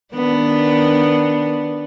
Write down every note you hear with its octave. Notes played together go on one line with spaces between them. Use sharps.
D#3 B3 D4